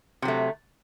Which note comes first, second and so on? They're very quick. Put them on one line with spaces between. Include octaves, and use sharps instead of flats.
C3 F#3 A3